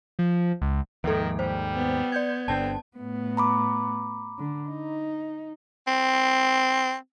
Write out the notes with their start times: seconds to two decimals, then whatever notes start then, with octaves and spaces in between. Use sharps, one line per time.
0.19 F3
0.61 C#2
1.04 D#2 G#2 D#3 F3 A4
1.39 G3 C5
1.75 B3
2.12 D5 G6 G#6
2.48 G1 D3 C4 A5
2.97 A2 B3
3.37 A#5 B5 D6
4.38 D3
4.69 D#4
5.87 C4